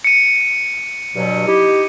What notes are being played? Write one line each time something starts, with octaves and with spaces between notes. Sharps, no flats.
C#7 D#7
G2 B2 F#3
D#4 E4 G4